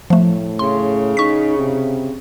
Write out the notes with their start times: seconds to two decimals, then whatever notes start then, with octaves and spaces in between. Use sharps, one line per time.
0.10 A2 F3 A3
0.59 C#3 C6
1.17 D#4 C#6 B6
1.58 C3